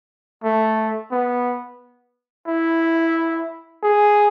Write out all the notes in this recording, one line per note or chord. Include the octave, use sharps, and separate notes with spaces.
A3
B3
E4
G#4